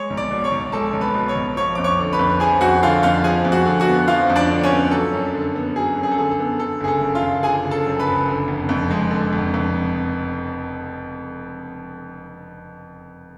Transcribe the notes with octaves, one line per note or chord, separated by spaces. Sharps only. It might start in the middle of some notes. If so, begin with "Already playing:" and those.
Already playing: G#3 C#5 C#6
B1
D5 D6
B2
C#5 C#6
B1
G#3 A4 A5
B1
B4 B5
B2
C#5 C#6
B1
F3 C#5 C#6
F2 D6
C#5 C#6
D3
B4 B5
F2
F3 G#4 G#5
F2 F#4 F#5
D3 F4 F5
F2 F4 F5
F3 G#4 G#5
F2
F#4 F#5
D3
F#4 F#5
B3
F3 F4 F5
F2
D4 D5
D3
C#4 C#5
B3
F#3 A4
F#2
D3
B3
F#3 G#4
F#2
G#4
A4
D3 G#4
A4
B3
D3 A4
F#1 G#4
A4
F#2
F4 F5
F#1
D3 G#4 G#5
F#1
A4 A5
F#2
B4 B5
F#1
D3
F1
F2
G#3
D3
F1
F2